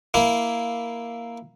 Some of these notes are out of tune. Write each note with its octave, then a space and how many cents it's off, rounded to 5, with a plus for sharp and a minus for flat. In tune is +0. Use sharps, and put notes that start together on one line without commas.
A#3 +0 E4 +0